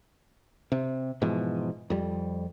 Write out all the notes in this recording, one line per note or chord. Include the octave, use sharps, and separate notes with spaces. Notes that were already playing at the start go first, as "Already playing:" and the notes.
C3
G#2 B2 E3 F3
F2 G3